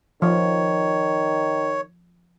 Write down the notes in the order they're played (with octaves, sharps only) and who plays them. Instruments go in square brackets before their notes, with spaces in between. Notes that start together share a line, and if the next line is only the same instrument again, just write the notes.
[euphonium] D#3 [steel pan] F3 [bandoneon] C#5